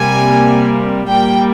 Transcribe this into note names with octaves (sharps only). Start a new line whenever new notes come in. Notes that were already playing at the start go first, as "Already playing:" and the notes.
Already playing: C3 G3 A#3 G#5
A#2 G3 A#3 G5